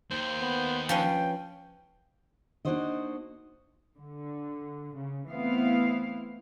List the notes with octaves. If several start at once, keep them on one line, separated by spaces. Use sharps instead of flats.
D#2 C5
B3
F3 C#4 B4 G5
A#3 D4 D#4 F#4 C5 D#5
D3
C#3
E3 A3 B3 C4 E4 F5